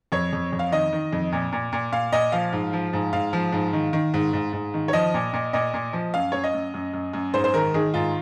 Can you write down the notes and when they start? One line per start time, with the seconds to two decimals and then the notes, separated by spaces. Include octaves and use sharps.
0.12 F2 C#5
0.33 F2
0.52 F2
0.59 F5
0.72 D#3 D#5
0.93 D#3
1.12 F2
1.32 A#2
1.52 A#2
1.72 A#2
1.92 A#2 F5
2.12 A#2 D#5
2.32 F3 F5
2.53 G#2
2.73 F3
2.93 G#2
3.13 G#2 F5
3.33 F3
3.52 G#2
3.73 D#3
3.93 D#3
4.14 G#2
4.33 G#2
4.53 G#2
4.74 D#3
4.88 C#5
4.93 F3 D#5
5.14 A#2
5.33 A#2
5.53 A#2 D#5
5.74 A#2
5.93 F3
6.14 F#2 F5
6.32 F#2 C#5
6.44 D#5
6.54 F#2
6.74 F#2
6.93 F#2
7.13 F#2
7.34 G#2 C5
7.44 C5
7.54 D#3 A#4
7.74 D#3 G#4
7.94 G#2 F4